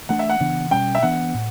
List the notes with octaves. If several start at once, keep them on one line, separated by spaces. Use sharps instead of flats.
E3 A3 D4 F#5
E5
F#5
C#3 E3 B3 D4
B2 G3 C#4 G5
E5
E3 B3 D4 F#5
A2